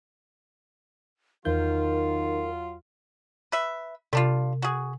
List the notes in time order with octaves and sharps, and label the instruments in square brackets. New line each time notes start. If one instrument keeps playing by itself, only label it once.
[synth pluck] E2 G6 [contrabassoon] D#3 [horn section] F#3 F4 [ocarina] A#4
[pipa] B4 E5
[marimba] C3 [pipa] G3 D4 F4
[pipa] F#4 G#4